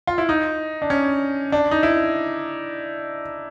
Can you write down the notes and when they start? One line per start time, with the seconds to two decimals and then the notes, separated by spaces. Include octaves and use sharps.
0.07 F4
0.18 E4
0.29 D#4
0.82 D4
0.90 C#4
1.52 D4
1.71 D#4
1.83 E4